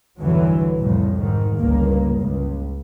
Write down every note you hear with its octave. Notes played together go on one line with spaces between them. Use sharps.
B1 E2 G2 D3 E3 F#3
C2 F2 A2
G#2 D#3
G1 C#2 G2 A#3
C#2